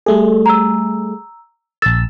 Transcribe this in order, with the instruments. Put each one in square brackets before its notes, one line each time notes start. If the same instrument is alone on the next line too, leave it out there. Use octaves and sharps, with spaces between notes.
[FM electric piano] G3 A3 G#4 [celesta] A4
[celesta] A#5 E6
[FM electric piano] A#1 E6 [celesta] A6